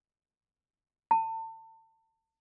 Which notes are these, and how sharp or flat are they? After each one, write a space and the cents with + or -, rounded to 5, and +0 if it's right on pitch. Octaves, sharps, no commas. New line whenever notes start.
A5 +35